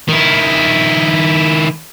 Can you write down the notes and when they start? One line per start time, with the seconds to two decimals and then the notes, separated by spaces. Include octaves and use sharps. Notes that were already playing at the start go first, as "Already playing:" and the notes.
0.08 D#3 E4